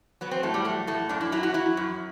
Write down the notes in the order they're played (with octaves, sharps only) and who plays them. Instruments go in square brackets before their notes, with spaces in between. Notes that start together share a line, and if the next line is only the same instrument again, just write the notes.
[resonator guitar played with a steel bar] F#3 B3
C4
A2 A3
G3
F#3 A3
A2 A3
F#2 D4
E4
F#3 E4
F#4
F#3 E4
F#2